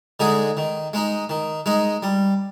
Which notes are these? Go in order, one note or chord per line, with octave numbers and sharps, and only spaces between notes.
D3 G#3 D#4 G#4
D#3
G#3 D#4
D#3
G#3 D#4
G3